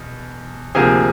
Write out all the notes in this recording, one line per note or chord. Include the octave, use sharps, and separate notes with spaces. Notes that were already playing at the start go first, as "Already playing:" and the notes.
Already playing: E2 B2
D2 C3 F3 A#3 G#4 G#5